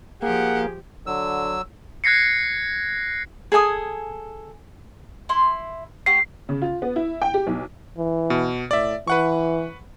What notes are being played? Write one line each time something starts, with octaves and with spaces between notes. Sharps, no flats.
F3 A#3 G4 G#4 F#5
D3 F#3 E6
F#6 G#6 A#6 C7 C#7
G#4 A4 G#5 D#6
E4 C6
A3 G4 F#5 C7
C#3
F4
B3
E4
G5
G4
B1
E3
B2
A2 D5 E5
E3 B4 F#5 C#6